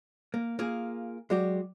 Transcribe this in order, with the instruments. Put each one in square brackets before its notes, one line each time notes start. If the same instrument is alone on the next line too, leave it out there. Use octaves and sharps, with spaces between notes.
[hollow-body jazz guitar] A#3
A#3 F4 G#4
[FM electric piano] F#3 D5 [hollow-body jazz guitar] G#3 F#4 G4